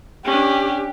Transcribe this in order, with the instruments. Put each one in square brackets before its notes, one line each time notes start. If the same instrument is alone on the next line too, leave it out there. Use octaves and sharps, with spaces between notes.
[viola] C#4 D4 [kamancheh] G4